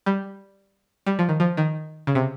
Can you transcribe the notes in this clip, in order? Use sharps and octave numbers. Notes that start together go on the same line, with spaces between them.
G3
G3
F3
D#3
F3
D#3
C#3
C3